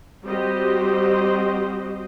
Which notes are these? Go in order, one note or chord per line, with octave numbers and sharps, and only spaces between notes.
G3 C4 F#4 G4 C5 D#5